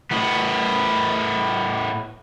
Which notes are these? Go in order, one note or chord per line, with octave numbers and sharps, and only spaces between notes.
A2 B3